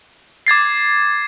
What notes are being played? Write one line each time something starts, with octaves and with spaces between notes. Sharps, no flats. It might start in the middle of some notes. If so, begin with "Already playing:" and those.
D6 G#6 A6 C7